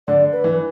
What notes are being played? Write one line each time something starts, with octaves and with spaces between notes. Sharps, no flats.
D3 D5
B4
E3